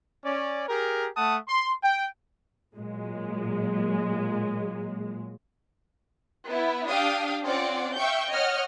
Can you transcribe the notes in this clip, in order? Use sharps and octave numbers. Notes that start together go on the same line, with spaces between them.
C#4 D5
G4 G#4 A#4
A3 F#5 A5 D#6
C6
G5
A#2 F#3 G#3
B3 E4
D4 G4 F5 G5 D#6
C4 C#4 F4 D5 F#5
E5 F5 G5 C#6 G6
C#5 D#5 F#5 F6